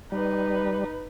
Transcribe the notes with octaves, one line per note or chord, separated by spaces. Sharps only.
G3 D#4 B4